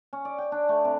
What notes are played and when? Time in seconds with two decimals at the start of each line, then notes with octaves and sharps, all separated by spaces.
0.13 C#4
0.25 D5
0.38 G5
0.52 D4
0.69 A3
0.85 C3